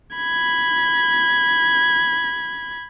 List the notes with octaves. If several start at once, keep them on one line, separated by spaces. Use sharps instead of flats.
B5 G#6